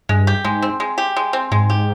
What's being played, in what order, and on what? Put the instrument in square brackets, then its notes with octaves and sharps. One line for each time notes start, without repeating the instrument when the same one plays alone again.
[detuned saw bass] G2 [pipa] G#3
[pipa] G4
[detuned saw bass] G#2 [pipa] G#3
[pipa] C4
G#3
G4
G#3
C4
[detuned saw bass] G#2 [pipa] G#3
[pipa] G4